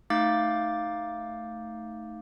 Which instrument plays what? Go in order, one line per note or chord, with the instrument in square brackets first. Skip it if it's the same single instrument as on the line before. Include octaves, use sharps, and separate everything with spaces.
[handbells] A3 D#4 F5 D6 G6 A6